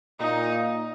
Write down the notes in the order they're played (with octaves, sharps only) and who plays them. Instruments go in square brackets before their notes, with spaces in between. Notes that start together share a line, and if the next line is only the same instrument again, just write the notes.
[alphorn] A#2 [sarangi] D#4